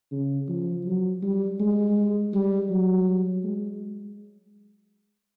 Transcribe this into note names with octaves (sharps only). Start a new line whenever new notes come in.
C#3
F3
F#3
G3
G#3
G3
F#3
G#3